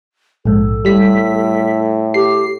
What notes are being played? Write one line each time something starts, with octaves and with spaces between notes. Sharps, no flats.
A#1 G#2 A4
A2 G3 B6
G4 C7